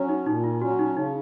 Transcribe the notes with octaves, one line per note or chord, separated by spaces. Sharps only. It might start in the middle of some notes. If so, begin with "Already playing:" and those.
Already playing: F#3 C#4
D#4
A#2 D#4
F4
F#3 C#4 F#4
D#4
C#3 D#4